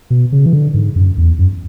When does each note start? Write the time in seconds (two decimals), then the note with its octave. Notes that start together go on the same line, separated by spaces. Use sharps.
0.10 B2
0.32 C#3
0.46 E3
0.53 D3
0.74 G#2
0.96 F#2
1.17 E2
1.39 F#2